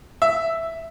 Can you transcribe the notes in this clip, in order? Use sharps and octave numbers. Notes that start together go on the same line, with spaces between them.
E5